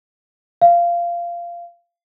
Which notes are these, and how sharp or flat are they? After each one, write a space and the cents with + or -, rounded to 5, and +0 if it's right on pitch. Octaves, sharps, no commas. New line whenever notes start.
F5 -15